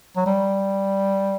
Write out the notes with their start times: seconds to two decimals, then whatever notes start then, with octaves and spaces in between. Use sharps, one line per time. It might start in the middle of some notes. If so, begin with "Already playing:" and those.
0.17 F#3
0.26 G3